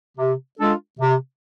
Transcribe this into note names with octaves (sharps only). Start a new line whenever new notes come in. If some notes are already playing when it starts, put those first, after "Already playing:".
C3
G#3 D4 F4 A4
C3